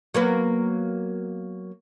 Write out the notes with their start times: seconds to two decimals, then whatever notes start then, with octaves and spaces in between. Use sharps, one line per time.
0.14 F#3 A#3 B3